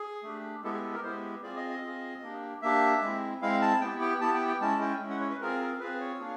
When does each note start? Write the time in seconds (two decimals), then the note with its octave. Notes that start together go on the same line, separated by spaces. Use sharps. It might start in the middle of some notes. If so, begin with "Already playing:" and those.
Already playing: G#4
0.23 A3 D4 G4
0.63 G#3 B3 E4 G4 A4
0.73 G#4
0.84 A4
0.93 A#4
1.03 G#3 B3 E4 G4 C5
1.43 C4 F4 G#4 D5
1.56 D#5
1.69 D#5
1.82 C4 F4 G#4
2.22 A#3 D4 G4
2.62 A#3 D4 G4 E5
3.02 G#3 C4 E4
3.42 G#3 C4 E4 F5
3.62 A5
3.81 B3 E4 G4 G5
4.01 G5
4.21 B3 E4 G4 A5
4.35 G5
4.48 G5
4.61 G#3 C#4 E4 A5
4.81 G5
5.01 G#3 C#4 E4
5.10 F#5
5.20 C#5
5.30 B4
5.41 C4 F4 G#4 A#4
5.60 A#4
5.80 C4 F4 G#4 B4
6.00 C#5
6.19 A#3 D4 F4 G#4